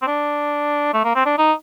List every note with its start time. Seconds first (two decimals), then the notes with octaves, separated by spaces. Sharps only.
0.02 C4
0.07 D4
0.93 A3
1.04 A#3
1.15 C4
1.26 D4
1.38 D#4